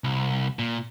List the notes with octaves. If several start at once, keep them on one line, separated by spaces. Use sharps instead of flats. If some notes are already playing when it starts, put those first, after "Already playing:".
C2
A#2